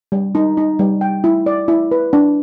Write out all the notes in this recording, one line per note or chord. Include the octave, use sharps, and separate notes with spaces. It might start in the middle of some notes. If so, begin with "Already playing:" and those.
G3
D#4
D#4
G3
G5
E4
D5
E4
B4
D4